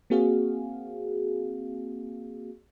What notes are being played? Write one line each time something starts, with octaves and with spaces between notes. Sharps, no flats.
A#3 C4 F#4 G#4 F5